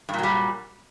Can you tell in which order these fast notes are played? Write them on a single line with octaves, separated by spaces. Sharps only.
G2 A#2 F#3 G3